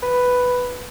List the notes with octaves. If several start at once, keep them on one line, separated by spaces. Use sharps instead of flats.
B4